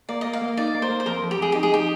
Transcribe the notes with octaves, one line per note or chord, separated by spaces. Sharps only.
A#3 D5
A#3 D#5
F5
A#3
D#4 D5
A#3
C5
A#3
C5
F2 A#4
F2
G4
F2 G#4
D#4 G4
G#4
D#4 G4